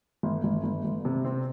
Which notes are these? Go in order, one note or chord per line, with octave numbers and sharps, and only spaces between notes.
G1
G1
G1
G1
C3
C4